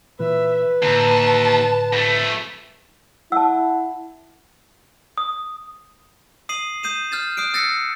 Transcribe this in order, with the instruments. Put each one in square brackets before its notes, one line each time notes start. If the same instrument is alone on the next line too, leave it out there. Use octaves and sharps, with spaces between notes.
[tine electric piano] A#2 E3 [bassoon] B4 [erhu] E5
[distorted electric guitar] D#2 [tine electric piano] A2 D3 [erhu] A5
[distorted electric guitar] F2 A3
[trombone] E4 [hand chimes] F#5 [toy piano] A5 E6
[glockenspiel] D#6
D#6 C7 D#7 F#7
D#6 G6 C7 D#7 E7
F6 G6 A6 E7
D#6 F#6 C7 D7
E6 F#6 A6 A#6 C7 C#7